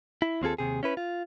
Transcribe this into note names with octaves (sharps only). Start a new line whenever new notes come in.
E4
D#2 C4 F4 G#4 A4
D#2 C3 G#4
C#4 E4 B4
F4